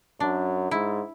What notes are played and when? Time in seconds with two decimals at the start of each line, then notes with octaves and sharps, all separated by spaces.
0.20 F#2 D4
0.71 G#2 E4